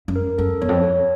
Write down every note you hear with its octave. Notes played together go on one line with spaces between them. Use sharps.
F#2
A#4
F#2 A4
E2 C#5
F2
C#5